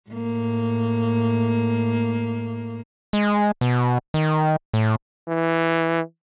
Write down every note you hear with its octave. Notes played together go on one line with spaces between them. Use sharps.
A2 A#3
G#3
B2
D#3
A2
E3